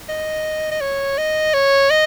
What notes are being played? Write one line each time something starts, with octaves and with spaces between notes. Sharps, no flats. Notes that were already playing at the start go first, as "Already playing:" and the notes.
D#5
D#5
C#5
D#5
C#5
D#5